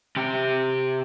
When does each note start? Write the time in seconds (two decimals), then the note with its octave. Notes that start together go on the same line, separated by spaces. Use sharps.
0.16 C3 G4